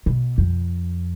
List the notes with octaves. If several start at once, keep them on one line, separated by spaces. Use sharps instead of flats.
B2
F2